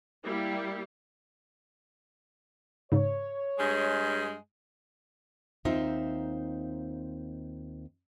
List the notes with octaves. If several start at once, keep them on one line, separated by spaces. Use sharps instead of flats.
G3 A#3 E4 G4
G#2 C#3 C#5
G2 G#3
D#2 C4 D#4 F4 C5 E5